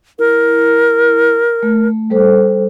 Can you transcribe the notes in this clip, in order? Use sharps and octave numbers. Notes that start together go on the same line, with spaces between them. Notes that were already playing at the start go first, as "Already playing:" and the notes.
E4 A#4
A3
G3 A4 C5